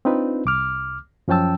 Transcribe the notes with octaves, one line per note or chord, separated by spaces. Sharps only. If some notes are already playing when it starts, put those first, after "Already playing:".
C4 D4 D#4 F4 B4
C2 D6 F6
F#2 F3 C#4 G5 A5 E6